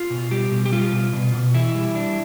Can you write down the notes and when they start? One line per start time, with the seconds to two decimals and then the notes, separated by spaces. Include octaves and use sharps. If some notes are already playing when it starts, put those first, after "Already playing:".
Already playing: F4
0.10 B2
0.31 G3 G4
0.52 B2
0.65 G4
0.72 G3 F4
0.93 B2
1.13 B2
1.34 B2
1.54 E3 E4
1.75 G3
1.95 D4